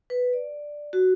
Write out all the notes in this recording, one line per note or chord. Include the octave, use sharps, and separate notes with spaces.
B4
D5
F#4